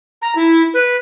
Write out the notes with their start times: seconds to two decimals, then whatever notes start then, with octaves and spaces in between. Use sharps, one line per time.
0.22 A#5
0.35 E4
0.74 B4